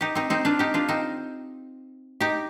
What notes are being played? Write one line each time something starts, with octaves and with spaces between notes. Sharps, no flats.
D#4 G4
C4 D#4
C4 D#4
D4 F4
D#4 G4
D4 F4
C4 D#4
D#4 G4